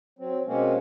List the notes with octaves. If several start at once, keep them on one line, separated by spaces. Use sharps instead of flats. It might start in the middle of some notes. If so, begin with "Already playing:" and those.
F#3 C4
B2 G#3 A#3 C4 C#4